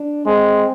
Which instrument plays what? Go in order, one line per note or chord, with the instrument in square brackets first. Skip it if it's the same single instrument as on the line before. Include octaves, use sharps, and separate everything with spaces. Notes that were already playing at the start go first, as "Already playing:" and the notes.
Already playing: [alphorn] D4
[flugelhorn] G#3 [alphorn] C4